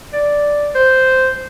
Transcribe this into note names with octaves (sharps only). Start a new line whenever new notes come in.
D5
C5